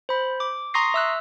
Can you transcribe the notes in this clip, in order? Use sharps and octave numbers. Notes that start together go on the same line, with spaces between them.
C5 B5
D6
A#5 C6 C#6 D#6 A#6 C7
E5 E6 F#6